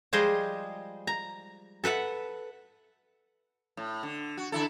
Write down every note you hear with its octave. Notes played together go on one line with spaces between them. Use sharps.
F3 G3 G#3 G#4 C5 D#5
A#5
A4 B4 E5 F#5
A2
D3
F#4
D3 E4 A4